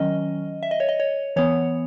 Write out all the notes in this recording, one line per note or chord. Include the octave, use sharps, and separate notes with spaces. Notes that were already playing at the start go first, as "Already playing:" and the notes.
Already playing: D#3 F#3 C#4 D#5
E5
D#5
C#5
D#5
C#5
E3 B3 C#5